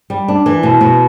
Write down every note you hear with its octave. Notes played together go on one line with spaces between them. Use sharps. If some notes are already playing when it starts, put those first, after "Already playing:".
G3
D4
E3
B2
B2